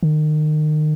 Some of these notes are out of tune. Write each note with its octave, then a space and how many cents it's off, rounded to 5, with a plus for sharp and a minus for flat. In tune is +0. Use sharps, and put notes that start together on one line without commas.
D#3 -30